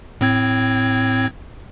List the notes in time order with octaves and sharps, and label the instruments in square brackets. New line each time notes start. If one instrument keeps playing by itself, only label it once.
[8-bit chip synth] A2 C4 G#6